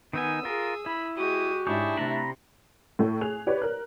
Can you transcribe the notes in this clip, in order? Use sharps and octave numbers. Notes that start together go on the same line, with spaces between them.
D#3 B3 D#4 G#5 D#6 E6
F4 G#4 A#4
E4 B5
G#3 F#4 G4 D#6
G#2 D4 E4 G4 G#4 C#5 A5
C3 A3 C4 D4 A#5 B5
A2 A3
G#4 F#6 F7
G4 B4 C#5 D5
A#4 F#6